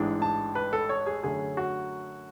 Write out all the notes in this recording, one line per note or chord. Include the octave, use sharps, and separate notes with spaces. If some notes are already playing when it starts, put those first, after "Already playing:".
Already playing: A1 G#2 E3 G#3 D4
A5
B4
A4
C#5
G#4
F#2 D3 A3 C#4 G#4
F#4